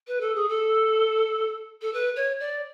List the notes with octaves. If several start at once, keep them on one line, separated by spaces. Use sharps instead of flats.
B4
A4
G#4
A4
A4
B4
C#5
D5